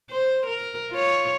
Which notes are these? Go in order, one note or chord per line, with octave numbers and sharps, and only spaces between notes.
C5
A#4
F4 C#5